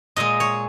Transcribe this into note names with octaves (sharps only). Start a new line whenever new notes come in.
A#2 G#3 D#5
C#5